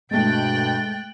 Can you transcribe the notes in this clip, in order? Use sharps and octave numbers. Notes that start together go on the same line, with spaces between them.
G2 B2 G#3 A3 G5 F#6 A6